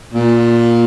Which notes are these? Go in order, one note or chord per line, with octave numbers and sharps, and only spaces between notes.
A#2